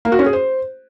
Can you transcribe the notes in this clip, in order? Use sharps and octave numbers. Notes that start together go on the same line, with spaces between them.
A#3
F#4
C#4
G#4
C5